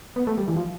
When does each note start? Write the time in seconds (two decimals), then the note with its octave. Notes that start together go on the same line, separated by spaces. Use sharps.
0.16 B3
0.27 A3
0.38 G3
0.48 E3
0.57 F3